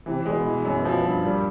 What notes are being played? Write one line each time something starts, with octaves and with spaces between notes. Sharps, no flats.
C3 E3
C3
A#2 G#3
B2
E3
F#2
F3
G2
A#2 G3